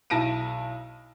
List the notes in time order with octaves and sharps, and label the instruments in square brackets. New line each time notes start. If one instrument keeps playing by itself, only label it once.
[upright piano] B1 E4 A5 A#6 D7 D#7